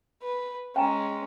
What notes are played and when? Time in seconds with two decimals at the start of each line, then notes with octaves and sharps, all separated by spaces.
0.23 B4
0.76 G#3 C#4 G5 G#5 A#5